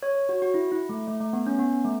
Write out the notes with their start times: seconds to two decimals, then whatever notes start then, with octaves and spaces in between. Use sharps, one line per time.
0.03 C#5
0.15 C#5
0.29 F#4
0.42 F#4
0.54 E4
0.72 E4
0.89 A3
1.07 A3
1.20 A3
1.33 B3
1.47 C#4
1.59 B3
1.84 A3